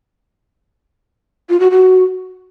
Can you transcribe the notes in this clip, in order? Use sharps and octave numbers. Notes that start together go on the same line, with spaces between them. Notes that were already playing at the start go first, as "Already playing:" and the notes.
F4
F#4
F#4